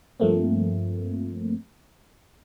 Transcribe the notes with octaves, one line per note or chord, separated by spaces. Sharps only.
G2 F3 A3 A#3 C4